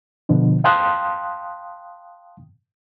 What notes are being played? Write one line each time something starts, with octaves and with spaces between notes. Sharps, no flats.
B2 D3 F3
F5 G5 A5 C6 D#6 F#6